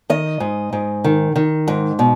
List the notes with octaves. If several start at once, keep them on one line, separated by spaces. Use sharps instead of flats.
D#3 D#5
G#2
G#2
D#3
D#3
G#2
B2